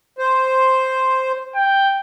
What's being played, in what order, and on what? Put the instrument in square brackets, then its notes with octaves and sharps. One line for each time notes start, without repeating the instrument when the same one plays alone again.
[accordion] C5
[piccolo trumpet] G5